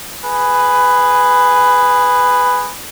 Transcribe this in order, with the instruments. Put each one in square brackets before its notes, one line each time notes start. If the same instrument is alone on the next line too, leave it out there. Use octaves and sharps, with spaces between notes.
[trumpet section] G#4 B4